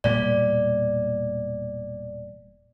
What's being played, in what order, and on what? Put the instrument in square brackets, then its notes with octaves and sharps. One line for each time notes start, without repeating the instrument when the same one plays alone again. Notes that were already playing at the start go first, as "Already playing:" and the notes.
[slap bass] E1 A#2 G3 [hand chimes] D5